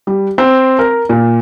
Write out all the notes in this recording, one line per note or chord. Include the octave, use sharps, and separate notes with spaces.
G3
C4
A#4
A#2